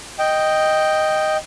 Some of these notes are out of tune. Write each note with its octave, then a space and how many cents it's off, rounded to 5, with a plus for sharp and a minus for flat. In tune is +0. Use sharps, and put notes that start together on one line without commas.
D#5 +0 G5 +0